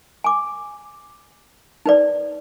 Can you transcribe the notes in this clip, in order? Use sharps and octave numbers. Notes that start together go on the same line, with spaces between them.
G#5 D6
D#4 B4 D5